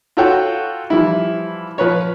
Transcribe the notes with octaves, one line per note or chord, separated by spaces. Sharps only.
F4 F#4 A4 C#5 F#5 G5
E3 F3 G3 E4
F3 B4 C#5